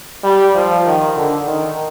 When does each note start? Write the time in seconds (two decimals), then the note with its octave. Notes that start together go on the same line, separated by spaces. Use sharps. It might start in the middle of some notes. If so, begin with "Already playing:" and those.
0.24 G3
0.55 F3
0.85 D#3
1.16 D3
1.47 D#3